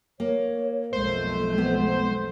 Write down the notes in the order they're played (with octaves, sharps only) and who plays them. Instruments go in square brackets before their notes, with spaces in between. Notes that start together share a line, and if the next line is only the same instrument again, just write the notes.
[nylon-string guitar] A#3 [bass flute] C#5
[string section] B1 F2 A3 [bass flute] G#3 [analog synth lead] C5
[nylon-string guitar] B3